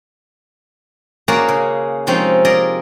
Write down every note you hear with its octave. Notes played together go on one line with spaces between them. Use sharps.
A#3 C#4 F#4 G#4 A#4 D5
C#3
C3 F3 G#3 C4 C#4 D#4
G#4 A#4 D5 D#5